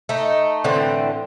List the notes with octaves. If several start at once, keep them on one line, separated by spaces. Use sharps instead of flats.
A3 D#4
A2 D3 E3 C4